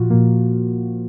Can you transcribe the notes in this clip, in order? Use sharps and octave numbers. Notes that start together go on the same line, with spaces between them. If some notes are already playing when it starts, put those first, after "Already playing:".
Already playing: A#2 F3 F4 F#4
A#2 F3 A#3